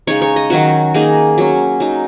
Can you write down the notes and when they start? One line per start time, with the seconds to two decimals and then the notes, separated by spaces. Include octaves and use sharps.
0.07 C#3 G#3 D#4 C#5
0.22 C#5
0.36 D#5
0.50 D#3 F#3 C#4 F#4
0.94 D#3 A#3 D#4 G#4
1.38 F#3 C#4
1.80 F#3 D#4